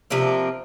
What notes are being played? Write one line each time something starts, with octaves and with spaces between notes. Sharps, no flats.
C3 F3 A#3 D4